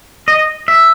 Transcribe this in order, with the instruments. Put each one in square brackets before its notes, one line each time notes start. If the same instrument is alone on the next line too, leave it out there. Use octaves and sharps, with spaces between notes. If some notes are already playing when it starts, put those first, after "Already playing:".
[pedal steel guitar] D#5
E5